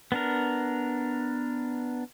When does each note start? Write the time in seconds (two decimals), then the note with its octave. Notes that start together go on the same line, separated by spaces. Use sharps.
0.12 B3 D4 A#4